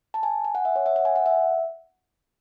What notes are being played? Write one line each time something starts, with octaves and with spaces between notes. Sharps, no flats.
A5
G#5
G#5
F#5
E5
C#5
E5
F#5
G#5
F#5
E5